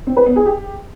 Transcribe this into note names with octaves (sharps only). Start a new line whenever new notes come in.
C4
B4
B3
G#4
G4